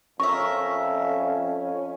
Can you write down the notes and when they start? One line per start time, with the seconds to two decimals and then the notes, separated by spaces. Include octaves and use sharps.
0.20 F2 C#4 A#4 E5 C#6